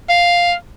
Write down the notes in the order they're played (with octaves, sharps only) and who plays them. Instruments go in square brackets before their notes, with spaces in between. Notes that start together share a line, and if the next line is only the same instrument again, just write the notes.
[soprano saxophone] F5